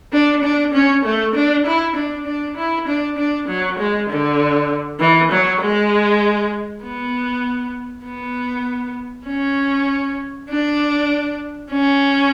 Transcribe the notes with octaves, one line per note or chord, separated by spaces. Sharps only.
D4
D4
C#4
A3
D4
E4
D4
D4
E4
D4
D4
F#3
G#3
D3
E3
F#3
G#3
B3
B3
C#4
D4
C#4